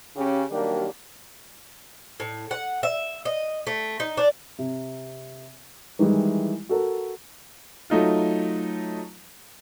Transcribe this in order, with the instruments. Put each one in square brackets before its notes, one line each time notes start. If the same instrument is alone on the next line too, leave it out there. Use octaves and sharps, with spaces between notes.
[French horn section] C#3 C#4 G4
D#3 F#3 G3 A#3 D4 G4
[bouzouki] A2
F#5
E5
D#5
A3
D#4
D4
[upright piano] C3
D#3 E3 G3 G#3 E4
F#4 A4 A#4
F#3 A3 D#4 F4